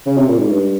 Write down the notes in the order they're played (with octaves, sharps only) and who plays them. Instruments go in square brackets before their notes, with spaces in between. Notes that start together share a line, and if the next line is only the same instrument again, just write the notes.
[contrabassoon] C#3
C3
A#2
G#2
G2